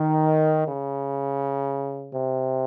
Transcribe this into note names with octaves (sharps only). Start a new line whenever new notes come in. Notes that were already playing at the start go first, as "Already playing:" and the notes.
Already playing: D#3
C#3
C3